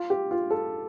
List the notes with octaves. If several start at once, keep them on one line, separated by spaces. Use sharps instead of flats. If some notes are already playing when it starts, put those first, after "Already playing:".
Already playing: F4
G4
F4
A4